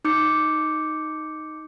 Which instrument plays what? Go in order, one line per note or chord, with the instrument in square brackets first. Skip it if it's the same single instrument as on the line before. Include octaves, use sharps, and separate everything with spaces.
[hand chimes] D#4 D6 G6 C#7